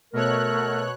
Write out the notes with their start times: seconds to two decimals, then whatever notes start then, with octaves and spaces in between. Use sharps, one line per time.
0.13 B2 A3 A#4 C#5 F#6